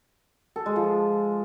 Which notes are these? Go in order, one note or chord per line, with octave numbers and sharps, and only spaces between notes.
A4
G#3
F3